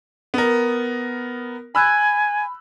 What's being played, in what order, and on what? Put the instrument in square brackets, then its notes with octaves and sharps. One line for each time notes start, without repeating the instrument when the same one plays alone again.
[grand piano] B3 A#4
[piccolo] G#5 [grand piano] B5 E6 F#6